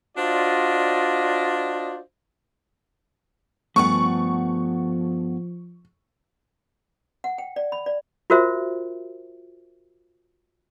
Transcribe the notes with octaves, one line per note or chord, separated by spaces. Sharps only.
D4 F4 F#4 C5 D5 D#5
G2 F3 A3 B3 F#5 G#5 C#6
F#5
G5
D5
B5
D5
F4 F#4 A#4 C5 E5